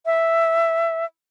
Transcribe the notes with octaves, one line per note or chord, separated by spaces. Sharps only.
E5